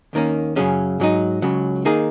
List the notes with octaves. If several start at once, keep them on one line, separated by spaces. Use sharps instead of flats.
D#2 D#3 A#3 C#4
F#2 C#3 F#3 C#4 G#4
G#2 F#3 D#4
C#2 C#3 F#3
D#3 A#3 D#4 G#4